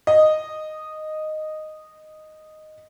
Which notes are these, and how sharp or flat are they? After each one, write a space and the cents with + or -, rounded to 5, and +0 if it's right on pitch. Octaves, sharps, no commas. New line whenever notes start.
D#5 -10